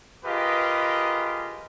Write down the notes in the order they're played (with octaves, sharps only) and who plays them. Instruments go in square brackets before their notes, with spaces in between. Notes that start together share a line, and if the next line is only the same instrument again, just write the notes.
[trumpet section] F4 G4 G#4 A#4 B4 D#5